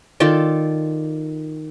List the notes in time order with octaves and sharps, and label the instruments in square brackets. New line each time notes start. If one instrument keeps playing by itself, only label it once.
[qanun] D#3 F4 A4 D5